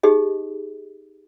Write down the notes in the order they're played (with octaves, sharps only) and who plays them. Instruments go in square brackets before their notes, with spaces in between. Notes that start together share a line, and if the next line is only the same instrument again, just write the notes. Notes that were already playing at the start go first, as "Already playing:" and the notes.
[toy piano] D#4 G4 G#4 D#5